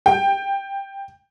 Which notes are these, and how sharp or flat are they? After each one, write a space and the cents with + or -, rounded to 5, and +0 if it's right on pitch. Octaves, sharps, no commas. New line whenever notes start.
G5 +15